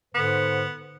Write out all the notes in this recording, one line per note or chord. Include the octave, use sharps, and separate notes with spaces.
G#2 D3 B3 C5